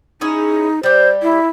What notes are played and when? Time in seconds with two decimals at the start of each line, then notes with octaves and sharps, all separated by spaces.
0.21 C#4 D#4 E4 G#4
0.83 G3 G4 C5
1.22 E4